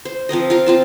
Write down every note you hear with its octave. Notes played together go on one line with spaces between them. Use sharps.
C5
F3 C4 A#4 D#5
F4 A#4
C4 F4 A5